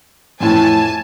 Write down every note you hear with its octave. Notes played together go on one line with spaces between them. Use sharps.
F2 A2 E3 G#5 A5